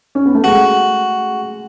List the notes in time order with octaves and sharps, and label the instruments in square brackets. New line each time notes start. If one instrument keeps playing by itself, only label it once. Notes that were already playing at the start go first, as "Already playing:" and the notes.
[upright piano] C#4
B3
A3
[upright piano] G#3 [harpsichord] F#4